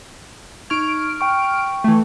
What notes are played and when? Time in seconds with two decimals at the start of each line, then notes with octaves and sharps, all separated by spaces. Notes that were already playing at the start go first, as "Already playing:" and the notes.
0.70 D#4 C#6 F6 G#6 D7
1.21 G5 C#6
1.84 E3 A3